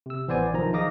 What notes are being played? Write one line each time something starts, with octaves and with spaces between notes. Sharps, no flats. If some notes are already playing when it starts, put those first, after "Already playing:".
C3 E6
A1 E3 B3 C5 D5 G#5
B1 D#3 F3 A#5
D#4 G#4 F5 D6 D#6 A#6